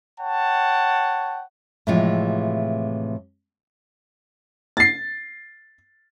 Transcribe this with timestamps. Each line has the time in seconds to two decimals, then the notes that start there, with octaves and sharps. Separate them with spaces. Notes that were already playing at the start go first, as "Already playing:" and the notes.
0.21 C#5 F#5 G5 A5
1.87 A2 C3 E3 F3 G#3 F4
4.77 A6 C7